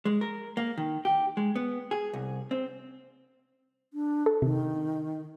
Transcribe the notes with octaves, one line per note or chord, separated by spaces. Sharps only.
G#3
A#4
A#3
D#3
G4
G#3
B3
G#4
C2
C4
D4
A4
C3 D#3